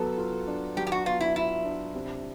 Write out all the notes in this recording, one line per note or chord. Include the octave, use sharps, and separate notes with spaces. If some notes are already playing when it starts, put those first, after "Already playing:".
Already playing: F#3 B3 A4
F4
D4
F#3 G4
G4
F#4
B3 F4
E4
E4 F4
D4
C3